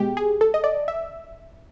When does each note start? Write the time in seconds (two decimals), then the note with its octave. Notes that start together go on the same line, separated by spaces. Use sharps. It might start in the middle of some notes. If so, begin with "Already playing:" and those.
Already playing: B2 G#3 G4
0.17 G#4
0.41 A4
0.54 D#5
0.64 D5
0.88 E5